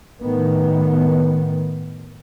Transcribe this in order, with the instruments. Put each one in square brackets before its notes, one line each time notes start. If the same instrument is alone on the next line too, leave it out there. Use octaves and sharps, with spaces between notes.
[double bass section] A2 D#3 B3